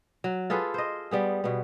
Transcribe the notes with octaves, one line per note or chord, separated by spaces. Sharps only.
F#3
F4 G#4 A4 B4
C5 D#5
G3 B3 G#4
B2 B3